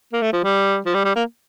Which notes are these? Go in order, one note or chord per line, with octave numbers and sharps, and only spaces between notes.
A#3
A3
F3
G3
F3
G3
G3
A#3